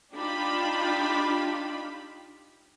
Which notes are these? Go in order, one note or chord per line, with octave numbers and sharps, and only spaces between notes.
D4 D#4 F4 G4 B5